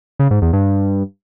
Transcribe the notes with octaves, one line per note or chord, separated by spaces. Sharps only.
C#3
G#2
E2
G2